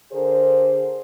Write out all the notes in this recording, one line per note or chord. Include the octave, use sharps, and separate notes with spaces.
D3 G#4 A#4 C5